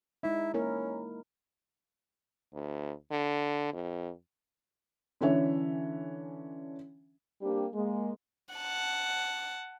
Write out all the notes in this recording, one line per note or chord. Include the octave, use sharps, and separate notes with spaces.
G#3 D#4 E4
A#3 C#4 E4 A#4
D2
D3
F2
D3 E3 C#4 D4 C#5 E5
G3 A#3 C4 D4 G4
G#3 A#3
F#5 A5